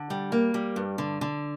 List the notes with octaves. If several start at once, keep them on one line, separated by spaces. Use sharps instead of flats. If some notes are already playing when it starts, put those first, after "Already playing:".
Already playing: D3
G3
A#3
G3
G2
D3
D3